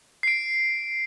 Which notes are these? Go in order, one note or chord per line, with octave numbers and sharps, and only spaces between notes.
C7 D7